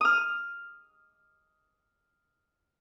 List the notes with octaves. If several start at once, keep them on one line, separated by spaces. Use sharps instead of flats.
D#6 F6